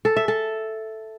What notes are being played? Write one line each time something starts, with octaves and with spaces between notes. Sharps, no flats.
A4
E5
A4